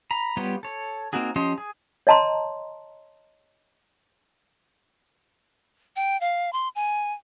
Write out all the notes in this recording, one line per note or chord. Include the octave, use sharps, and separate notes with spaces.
A#5 B5
G3 B3 F4 G4 C#5
A4 C#5
A#3 C4 D#4 F#4 G#4
F3 C#4 G4 D#5 C6
G#4
C#5 D#5 A5 A#5 C6
G5
F5
C6
G#5